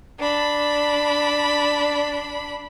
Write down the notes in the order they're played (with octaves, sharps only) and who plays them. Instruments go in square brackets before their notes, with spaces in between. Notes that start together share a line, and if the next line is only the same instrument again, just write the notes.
[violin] D4 B5